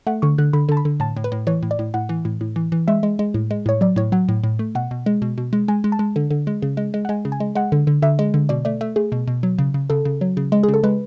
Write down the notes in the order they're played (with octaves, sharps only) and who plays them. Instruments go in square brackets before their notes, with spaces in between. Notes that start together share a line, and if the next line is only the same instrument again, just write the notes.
[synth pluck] A3 F#5
D3 C#6
D3 F#6
D3 B5
D3 A5
B5
D3
A2 A5
A2
B4
A2
E3 C#5
A2
D5
A2
A2 F#5
E3
A2
A2
E3
E3
G#3 E5
G#3
G#3
A2
G#3
A2 C#5
F#3 D5
A2 C#5
F#3 F#5
A2
A2
A3
B2 F#5
B2
G#3
B2
B2
G#3
G#3 G#5
G#3
A5
G#3
D3
D3
G#3
C#3
G#3
G#3
F#5
G#3 G#5
C#3
G#5
G#3
G#3 F#5
D3
D3
D3 E5
G#3
D3
B2 D5
A3 D5
A3 E5
A3 G#4
B2
B2
F#3
C#3
C#3
C#3 A4
C#3
F#3
C#3
G#3
G#4
C#3
A4
G#3 B4